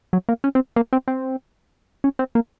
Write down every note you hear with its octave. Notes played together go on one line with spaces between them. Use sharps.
F#3
A#3
C#4
C4
A#3
C4
C4
C#4
C4
A#3